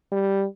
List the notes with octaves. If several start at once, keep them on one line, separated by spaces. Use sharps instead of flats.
G3